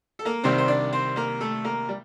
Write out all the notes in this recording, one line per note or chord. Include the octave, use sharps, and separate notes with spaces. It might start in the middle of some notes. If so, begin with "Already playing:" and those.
A4
A#3 A#4
C2 C3 D#3 G3 C4 C5
C5
D4 D5
C4 C5
A#3 A#4
A3 A4
A#3 A#4
G3